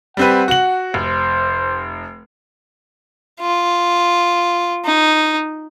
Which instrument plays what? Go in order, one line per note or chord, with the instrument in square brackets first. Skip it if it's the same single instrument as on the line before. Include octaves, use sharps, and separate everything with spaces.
[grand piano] G3 C4 B4 [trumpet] F#5
[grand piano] F#4 F#7
[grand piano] F1 [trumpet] C5
[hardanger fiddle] F4
D#4